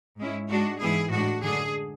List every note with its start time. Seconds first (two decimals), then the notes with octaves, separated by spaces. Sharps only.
0.18 G#2 G#3 C#4 E4
0.49 G#2 G#3 D4 F#4
0.80 G#2 E3 B3 E4 G#4
1.11 A2 G#3 D4 F#4
1.43 F#2 D3 G#3 D4 G#4